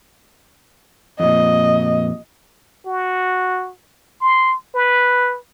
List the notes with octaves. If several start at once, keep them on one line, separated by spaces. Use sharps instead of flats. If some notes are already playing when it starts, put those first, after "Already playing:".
F2 A#2 D#5
F#4
C6
B4